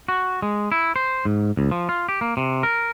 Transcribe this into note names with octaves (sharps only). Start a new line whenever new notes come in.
F#4
G#3
E4
C5
G#2
C#2
F3
F4
G4
A#3
C3
A#4